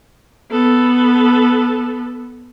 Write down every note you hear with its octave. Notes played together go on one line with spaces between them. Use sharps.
B3 A4